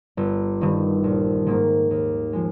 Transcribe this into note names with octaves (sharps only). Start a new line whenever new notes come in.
G1
G2 D#3
A#1
G#2 D#3 A#3
D#2
F3 G#3